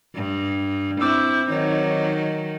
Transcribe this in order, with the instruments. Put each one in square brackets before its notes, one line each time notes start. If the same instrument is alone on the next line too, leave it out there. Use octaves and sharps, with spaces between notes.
[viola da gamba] G2
[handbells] C4 D6 E6 [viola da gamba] E4 [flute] G6
[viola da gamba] D#3 F#3 D#4 [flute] C#5